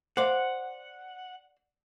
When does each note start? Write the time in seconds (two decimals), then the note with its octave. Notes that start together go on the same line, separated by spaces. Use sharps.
0.17 C5 D5 F5 F#5